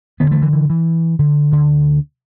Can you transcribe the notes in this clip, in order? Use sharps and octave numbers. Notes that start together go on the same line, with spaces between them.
D2 D3 F#3 B3
E3 A3
E3
E3
E3
D3
D2 D3